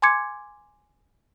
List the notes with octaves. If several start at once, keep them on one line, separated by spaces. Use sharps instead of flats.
G#5 C6 D6 G#6 C#7